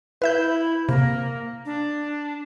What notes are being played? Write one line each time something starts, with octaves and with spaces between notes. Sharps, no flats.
E4 B4 E5 G6
E4
C3 A#3
D4